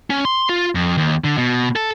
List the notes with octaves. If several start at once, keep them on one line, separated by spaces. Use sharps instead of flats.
C#4
C6
F4
F2
D#2
D3
B2
A4